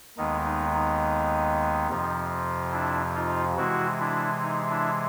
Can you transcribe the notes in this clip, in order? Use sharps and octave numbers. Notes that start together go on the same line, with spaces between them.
D#2 D#3 G#3 B3 D#4
D#4
D#4
F2 C3 F3
D4 E4
D#4 F4
C3 E3 G#3 E4 F#4
D4 E4
D#4
D4 E4